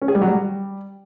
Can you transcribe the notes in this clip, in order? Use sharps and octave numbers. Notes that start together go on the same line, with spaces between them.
C#4
G#4
G3
F#3
G3